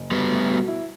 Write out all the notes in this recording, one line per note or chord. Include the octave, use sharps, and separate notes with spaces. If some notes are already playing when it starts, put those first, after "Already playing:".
Already playing: F#1
F#3 G3 B3
A3
B2
E4